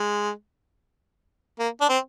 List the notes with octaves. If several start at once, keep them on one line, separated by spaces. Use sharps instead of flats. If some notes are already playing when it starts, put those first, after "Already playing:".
Already playing: G#3
A#3
D4
C4